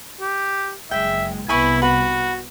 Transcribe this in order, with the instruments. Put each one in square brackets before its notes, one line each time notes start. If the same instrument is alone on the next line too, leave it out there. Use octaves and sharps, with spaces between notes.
[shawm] G4
[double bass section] F#1 G#3 [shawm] E5 [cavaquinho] G5
[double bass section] C2 C3 B3 [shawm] E4 [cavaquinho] G#5 B5 C#6
[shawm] F#4 [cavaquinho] B4 F#5 B5